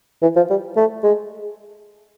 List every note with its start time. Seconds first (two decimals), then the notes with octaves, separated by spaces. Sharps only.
0.22 E3
0.36 F3
0.50 G3
0.77 A3
1.04 G#3